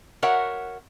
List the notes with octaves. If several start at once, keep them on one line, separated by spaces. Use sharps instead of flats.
F#4 A#4 C#5 E5 F#5